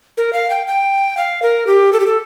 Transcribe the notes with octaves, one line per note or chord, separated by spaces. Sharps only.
A#4
F5
G5
G5
F5
A#4
G4
A4
G4
A4